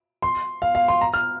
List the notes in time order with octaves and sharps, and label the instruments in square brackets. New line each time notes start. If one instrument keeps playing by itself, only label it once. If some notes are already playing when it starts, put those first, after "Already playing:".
[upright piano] C6
F5
F5
C6
A#5
F6